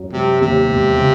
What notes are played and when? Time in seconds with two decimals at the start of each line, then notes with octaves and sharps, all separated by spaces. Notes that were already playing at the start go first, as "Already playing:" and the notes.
Already playing: F#2
0.12 C3 F#3
0.41 D#2 C3
0.69 E1
0.96 C#3